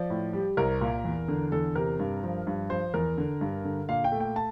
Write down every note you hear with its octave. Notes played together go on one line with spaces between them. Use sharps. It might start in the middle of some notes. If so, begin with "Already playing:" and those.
Already playing: F3 D5
A2
G3
C2 A#4
A#2
E2
D3
E2 A4
C3 A#4
G2
F3
G2
F3 C5
E2 A#4
D3
G2
D3
A#2 F5
G5
A3
G5
A5